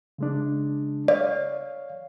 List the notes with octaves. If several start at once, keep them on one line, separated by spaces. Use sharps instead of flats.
C#3 G#3 D4
C#5 D5 F5